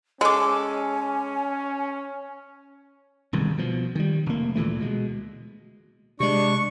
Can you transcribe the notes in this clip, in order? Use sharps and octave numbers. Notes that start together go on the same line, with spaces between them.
G#3 C#4 A4 G#5 D6
E1 C2 G2 D#3
B2 F3
D#3 G3
F1 A#3
D2 A#2 E3 A3
B2 G#3
C3 G#3 D4 C#6